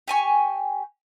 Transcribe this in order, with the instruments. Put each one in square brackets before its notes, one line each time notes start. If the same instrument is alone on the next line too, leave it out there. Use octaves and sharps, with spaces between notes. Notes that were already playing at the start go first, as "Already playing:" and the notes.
[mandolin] G4 G#5 C#6